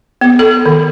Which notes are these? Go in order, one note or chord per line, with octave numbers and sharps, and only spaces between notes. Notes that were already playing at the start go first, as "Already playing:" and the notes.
B3
A4
D#3